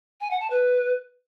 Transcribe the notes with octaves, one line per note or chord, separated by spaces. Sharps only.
G#5
F#5
A5
B4